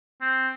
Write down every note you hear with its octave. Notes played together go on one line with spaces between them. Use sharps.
C4